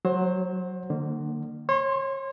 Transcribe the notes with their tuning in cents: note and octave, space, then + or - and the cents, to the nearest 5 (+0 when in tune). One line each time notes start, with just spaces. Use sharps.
F#3 +0 C5 +25
D3 +35 A#3 -20
C#5 -35 C6 +0